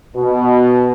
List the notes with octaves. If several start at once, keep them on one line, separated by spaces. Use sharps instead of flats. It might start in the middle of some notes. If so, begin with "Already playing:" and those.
B2